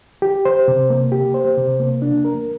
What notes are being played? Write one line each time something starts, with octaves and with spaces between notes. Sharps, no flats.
G4
C5
C3
A#3
G4
C5
C3
A#3
D4
A#4